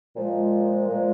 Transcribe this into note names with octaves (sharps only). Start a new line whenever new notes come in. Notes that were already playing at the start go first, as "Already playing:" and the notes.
A#2 F3 G#3
A#2 F3 G#3